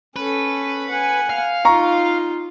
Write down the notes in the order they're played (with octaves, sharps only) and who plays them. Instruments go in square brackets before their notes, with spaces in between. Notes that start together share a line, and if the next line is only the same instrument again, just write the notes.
[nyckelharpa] C#4 A4 [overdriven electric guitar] B4
[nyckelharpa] F#5 G#5
[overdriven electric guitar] F5
[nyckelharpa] D#4 F4 [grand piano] A#5 C#6